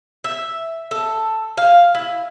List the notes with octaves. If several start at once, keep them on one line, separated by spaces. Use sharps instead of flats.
E5
A4
F5
E4